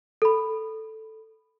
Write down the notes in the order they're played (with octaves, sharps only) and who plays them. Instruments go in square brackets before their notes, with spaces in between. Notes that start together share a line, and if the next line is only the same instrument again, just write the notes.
[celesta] A4 B5